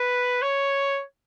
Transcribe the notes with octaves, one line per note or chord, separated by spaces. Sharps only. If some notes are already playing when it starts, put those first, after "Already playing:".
Already playing: B4
C#5